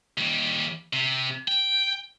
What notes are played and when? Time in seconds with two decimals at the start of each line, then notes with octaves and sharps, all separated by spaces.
0.18 D#2 G3
0.93 C3
1.48 G5